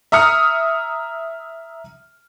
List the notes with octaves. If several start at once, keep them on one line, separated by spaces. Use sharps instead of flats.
E5 A#5 D#6 F6 C#7